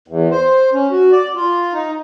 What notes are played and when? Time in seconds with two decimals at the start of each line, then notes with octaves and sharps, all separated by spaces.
0.08 E2
0.31 C5
0.73 C#4
0.91 F#4
1.12 D5
1.35 F4
1.74 D#4